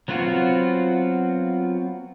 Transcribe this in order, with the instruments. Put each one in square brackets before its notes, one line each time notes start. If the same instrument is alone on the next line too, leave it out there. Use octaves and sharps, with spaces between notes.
[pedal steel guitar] F#3 B3 C4 F4 F#4